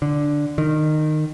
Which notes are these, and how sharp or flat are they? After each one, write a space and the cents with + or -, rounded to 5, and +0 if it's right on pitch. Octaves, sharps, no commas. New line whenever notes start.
D3 +0
D#3 -20